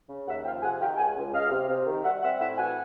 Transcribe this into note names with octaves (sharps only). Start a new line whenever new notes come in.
C#3
D#2 E5 F#5
F3 F5 G5
C3 F#5 G#5
D#3 F5 G5
C#2 F#5 G#5
C#2
C#2 D#5 F5
C3
C3
D#3
G3 E5 F#5
C4 E5 F#5
A2 E5 F#5
E3 F#5 G#5